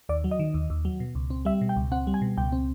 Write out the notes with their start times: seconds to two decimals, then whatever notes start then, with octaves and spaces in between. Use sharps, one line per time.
0.09 D#2 D5
0.24 F#3
0.31 D#5
0.39 D#3
0.54 D#2
0.70 D#2
0.85 F#3
1.00 B2
1.15 C#2
1.30 C4
1.45 G3 E5
1.61 B2
1.69 G5
1.76 C#2
1.92 C4 F#5
2.07 G3
2.14 G#5
2.22 B2
2.37 C#2 G5
2.52 C4